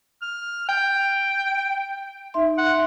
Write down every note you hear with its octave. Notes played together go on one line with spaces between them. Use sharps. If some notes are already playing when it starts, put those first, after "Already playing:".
F6
G5
D#4 E5 C6
F#5